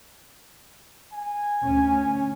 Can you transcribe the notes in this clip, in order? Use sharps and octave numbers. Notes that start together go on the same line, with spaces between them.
G#5
D2 C#4